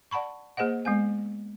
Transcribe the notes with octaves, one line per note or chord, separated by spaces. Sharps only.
D5 F#5 A5 B5 C#6
A#3 G#4 C5 D#5 F#5
G#3 B3 G#5